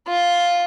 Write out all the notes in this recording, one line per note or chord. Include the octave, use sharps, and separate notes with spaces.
F4